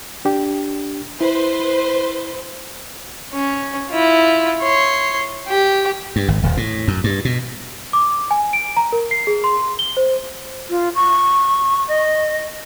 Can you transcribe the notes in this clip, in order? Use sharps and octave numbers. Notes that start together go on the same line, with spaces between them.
D4 G4
E4 B4 C5
C#4
E4 F4
C#5 C6
G4
G2
G#1
D#1
A2
F#2
G2
B2
D6
G#5
D7
A#5
A#4
C7
G#4
C6
G7
C5
F4
C#6
D#5